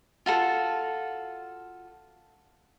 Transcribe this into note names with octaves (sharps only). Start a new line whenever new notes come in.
F4 F#4 A4